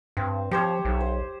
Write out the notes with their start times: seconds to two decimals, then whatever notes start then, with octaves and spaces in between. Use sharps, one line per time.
0.17 G2 C4
0.51 F3 G4 C5 C#5
0.85 B1
1.01 C5